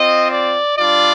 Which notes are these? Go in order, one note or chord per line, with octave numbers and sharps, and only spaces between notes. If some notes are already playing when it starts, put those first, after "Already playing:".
Already playing: C4 F4 D#5
D5
G3 D4 F4 D5